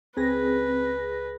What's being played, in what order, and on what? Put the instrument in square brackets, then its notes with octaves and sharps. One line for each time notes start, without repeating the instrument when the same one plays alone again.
[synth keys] C#2 G#4 A#6 [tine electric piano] C4 [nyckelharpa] B4